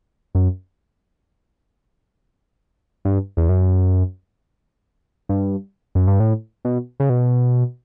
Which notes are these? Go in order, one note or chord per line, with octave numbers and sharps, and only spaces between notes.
F#2
G2
E2
F#2
G2
F#2
G2
A2
B2
C#3
B2